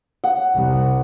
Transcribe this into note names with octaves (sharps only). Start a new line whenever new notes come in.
F#5
C2